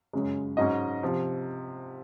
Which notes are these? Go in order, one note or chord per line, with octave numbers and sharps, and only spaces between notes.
F#2 C#3 G#3
G#2 F#3 C#4 D#5
C3 F3